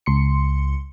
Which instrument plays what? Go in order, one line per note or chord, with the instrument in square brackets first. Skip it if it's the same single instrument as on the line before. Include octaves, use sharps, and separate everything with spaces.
[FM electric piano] C#2 C6 C#7